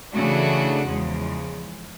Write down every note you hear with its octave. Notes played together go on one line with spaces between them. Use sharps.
C#3 E3 A3 D4 F#4
E2 C#3 F3 G#3